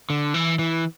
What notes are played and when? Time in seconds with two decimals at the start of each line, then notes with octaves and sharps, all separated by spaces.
0.10 D3
0.34 E3
0.59 E3